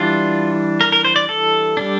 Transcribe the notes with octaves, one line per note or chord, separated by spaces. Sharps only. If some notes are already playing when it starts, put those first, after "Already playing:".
Already playing: E3 G3 D4 F4
A#4
A#4
C5
D5
A4
G3 D4